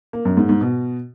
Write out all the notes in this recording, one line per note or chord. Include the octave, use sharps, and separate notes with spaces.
A#3
F#2
G#2
G#2
B2